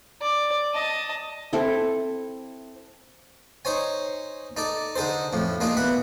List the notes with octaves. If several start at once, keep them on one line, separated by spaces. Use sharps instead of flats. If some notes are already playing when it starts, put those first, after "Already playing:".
D5
D#5 A5
C4 E4 A4
D#4 C5 C#5 G#5
D#4 A4 D5
D3 D#4 G#4 A4 C5
F2 A2 F3
A#3 D4 D#4 F4 G#4
B2 E3 F#5 B5